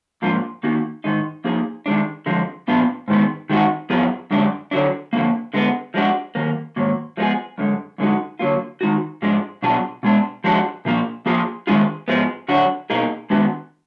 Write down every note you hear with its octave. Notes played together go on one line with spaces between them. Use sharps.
G#2 F3 A#3 D4 F4
D#3 A#3 D#4 F#4
G#2 D#3 G#3 D#4
F3 A#3 D#4 G#4
D#3 G#3 D4
F2 D3 F3 G#3
A#2 F3 B3 D4 F4
G#2 D#3 G#3 B3
D#3 G#3 D#4 F#4
F#2 F3 B3 F4 G#4
F#2 D3 G#3 D4
D3 F#3 D4
F2 D3 F3 A#3
D3 G#3 B3
F3 G#3 D4 F#4
F#2 D#3 A#3
G#2 D#3 F#3 A#3
F3 G#3 B3 F4 G#4
F#2 D3 G#3
F#2 D3 G#3 D#4 F#4
D3 F#3 A#3 F4
D#3 G#3 D#4 F#4
G#2 F3 G#3 D4
B2 F#3 D4 F4 G#4
B2 G#3 D4
F3 G#3 D4 F#4
A#2 F3 A#3 D4
F3 A#3 F4 G#4
D#3 G#3 D4 F4 G#4
G#2 F3 G#3 B3
D3 F#3 D4 F#4
B2 A#3 D#4 G#4
D#3 G#3 B3 D4 F#4